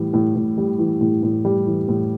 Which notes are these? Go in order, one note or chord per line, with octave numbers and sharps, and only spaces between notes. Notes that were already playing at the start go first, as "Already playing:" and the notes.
Already playing: A2 E3 G3
A2
A2
G3
E3
A2
A2
G3
E3
A2